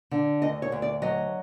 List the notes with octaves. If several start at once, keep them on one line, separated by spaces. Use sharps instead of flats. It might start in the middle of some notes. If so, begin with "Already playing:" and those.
D3
D2 D#5
C#5
D2
D5
F#3 D#5